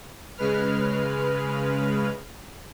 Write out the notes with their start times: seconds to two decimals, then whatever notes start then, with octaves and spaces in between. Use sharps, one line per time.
0.38 C#3 G#3 B4 F6